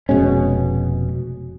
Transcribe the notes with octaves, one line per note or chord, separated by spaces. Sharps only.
F1 B2 G#3 C#4